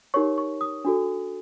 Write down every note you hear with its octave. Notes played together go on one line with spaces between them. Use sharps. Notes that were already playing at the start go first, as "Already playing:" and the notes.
D#4 G4 A#4 C#5 C#6
C#6
D#6
D4 F#4 A4